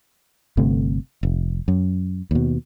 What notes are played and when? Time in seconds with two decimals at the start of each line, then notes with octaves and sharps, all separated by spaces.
0.57 G1 C3 A3
1.23 F1
1.68 F#2
2.31 D#2 B2